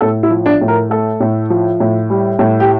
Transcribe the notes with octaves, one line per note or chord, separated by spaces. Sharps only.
A2 A4
E4
F3
D4
A2
A#4
A3 A4
A2
F3
A2
G3
A2
G4